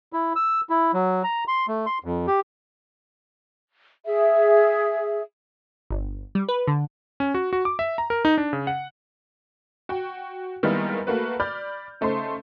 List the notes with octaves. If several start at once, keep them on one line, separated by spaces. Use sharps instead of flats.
E4
E6
E4
F#3
A#5
C6
A3
C6
F2
G4
G#4 E5
G1
G3
B4
D3
C#4
F#4
F#4
D6
E5
A#5
A#4
D#4
D4
C#3
F#5
F#4 G5
D#3 G3 G#3 A#3 B3 E4
A3 A#3 F#4 B4
D5 B5 F6 G6
C#3 A3 D#4 C5 C6